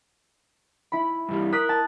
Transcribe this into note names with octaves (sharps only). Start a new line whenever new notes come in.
E4 B5
G2 E3 G3
A#4 D#6 F#6 B6
A5